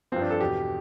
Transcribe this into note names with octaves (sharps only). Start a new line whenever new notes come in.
G2 F3 C4
D4
A4
E2 B2 G4